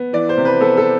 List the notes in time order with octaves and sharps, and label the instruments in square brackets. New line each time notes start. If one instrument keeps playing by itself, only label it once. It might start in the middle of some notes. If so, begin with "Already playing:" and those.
Already playing: [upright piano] B3
E3 D5
C5
C3
B4
B3 A4
A4